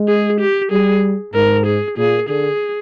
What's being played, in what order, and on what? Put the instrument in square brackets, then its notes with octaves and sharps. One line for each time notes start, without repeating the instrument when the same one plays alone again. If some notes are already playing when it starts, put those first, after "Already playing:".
Already playing: [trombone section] G#3
[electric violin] G#4
G4
[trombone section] G3 [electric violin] G#4
[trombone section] G#2 [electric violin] A#4
[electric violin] G#4
[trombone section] A#2 [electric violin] G#4
[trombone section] D3 [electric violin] G#4